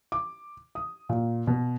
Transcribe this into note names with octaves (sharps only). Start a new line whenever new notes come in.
D6
D#6
A#2
B2